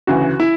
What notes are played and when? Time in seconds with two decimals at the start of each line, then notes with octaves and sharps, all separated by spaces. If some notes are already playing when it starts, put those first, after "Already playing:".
0.07 D2 C#3 E3 F#4
0.40 E4